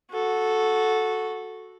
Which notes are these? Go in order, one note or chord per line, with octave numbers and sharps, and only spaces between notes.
F#4 A4